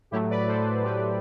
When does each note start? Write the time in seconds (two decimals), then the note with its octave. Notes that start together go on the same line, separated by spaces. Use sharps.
0.11 A2 F#3 A3 E4 G4
0.30 B4 D5
0.48 A4 C5
0.83 A2 F#3 A3 G4 B4